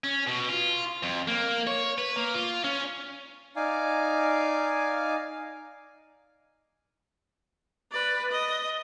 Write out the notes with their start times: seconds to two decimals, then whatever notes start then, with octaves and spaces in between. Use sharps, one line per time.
0.04 C#4
0.27 B2
0.49 F4
1.03 F2
1.28 A#3
1.67 C#5
1.98 B4
2.16 A#3
2.34 F4
2.64 C#4
3.56 D#4 D5 F5 G#5
7.92 B4 D5
8.31 D#5